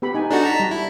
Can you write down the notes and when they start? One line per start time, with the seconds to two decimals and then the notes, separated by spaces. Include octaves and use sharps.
0.02 B3 G4 B5
0.15 D#4 G#5
0.31 D4 D#4 F#4 A4 D5
0.43 A5 A#5 B6
0.60 G3
0.71 E4